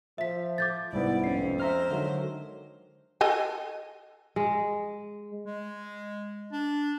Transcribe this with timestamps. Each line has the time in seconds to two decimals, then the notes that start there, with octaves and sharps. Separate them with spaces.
0.18 F3 E5 B6
0.58 D6 G6 A6
0.93 C2 G#2 B3 E4 D5
1.24 F2 C#4 C7
1.60 G#3 C5 E5 A#5 F6
1.91 D3 D#3 F#3
3.21 A4 D#5 G#5
4.36 G#3
5.46 G#3
6.52 D4